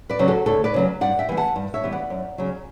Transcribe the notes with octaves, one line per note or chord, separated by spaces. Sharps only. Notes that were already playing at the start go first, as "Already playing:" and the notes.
B4 D5
C#3 F#3 C#4
F#4 A4
D2 A4 C#5
B4 D5
C#3 F#3 C#4
G2 D5 F#5
E5 G5
E3 G3 B3
F#5 A5
G2
C#5 E5
E3 G3 B3
D5 F#5
F#2
C#3 F#3